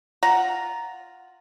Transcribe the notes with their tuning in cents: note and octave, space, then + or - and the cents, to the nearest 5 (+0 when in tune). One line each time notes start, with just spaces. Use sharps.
F4 +0 F#5 +0 A#5 +0